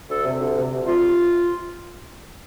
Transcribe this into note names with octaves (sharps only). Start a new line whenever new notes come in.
D2 A4
C3
D2
C3
D2
C3 F4